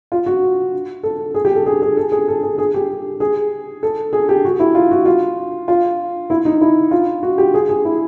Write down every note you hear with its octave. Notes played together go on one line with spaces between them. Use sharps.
F4
F#4
A4
G#4
G4
A4
G#4
G#4
A4
G#4
A4
G#4
G#4
G4
G#4
A4
G#4
G4
F#4
E4
F4
F#4
F4
F4
E4
D#4
E4
F4
F#4
G4
G#4
G#4
E4